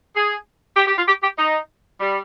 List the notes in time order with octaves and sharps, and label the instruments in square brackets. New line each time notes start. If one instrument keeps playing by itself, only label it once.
[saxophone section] G#4
G4
G4
F4
G4
G4
D#4
G3